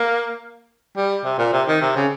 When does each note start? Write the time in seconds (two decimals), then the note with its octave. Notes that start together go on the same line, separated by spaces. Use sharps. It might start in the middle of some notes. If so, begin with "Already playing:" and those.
Already playing: A#3
0.97 G3
1.25 C3
1.39 A#2
1.53 C3
1.68 D#3
1.82 C3
1.96 C#3